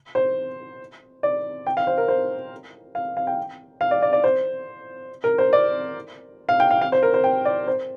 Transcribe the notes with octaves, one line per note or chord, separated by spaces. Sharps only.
C5
D5
G5
F5
C5
A#4
C5
F5
F5
G5
F5
D5
D5
D5
C5
A#4
C5
D5
F5
G5
F5
F5
C5
A#4
C5
G5
D5
C5